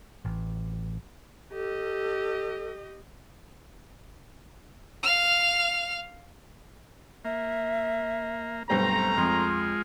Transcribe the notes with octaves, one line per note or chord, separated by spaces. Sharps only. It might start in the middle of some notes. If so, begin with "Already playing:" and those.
A1
G4 A4 D#5
F5 F6
A#3 E5
B1 G2 A3 C4 C5 A#5
F2 G#3 F4 C6